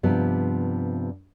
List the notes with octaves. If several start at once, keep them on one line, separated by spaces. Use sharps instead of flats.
G2 C3 F3 B3